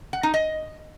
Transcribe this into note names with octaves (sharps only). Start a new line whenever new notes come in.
F#5
D#4
D#5